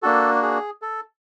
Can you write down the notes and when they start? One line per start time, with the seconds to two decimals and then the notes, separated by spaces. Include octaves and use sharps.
0.02 A#3 D4 F#4 A4
0.42 G#4
0.82 A4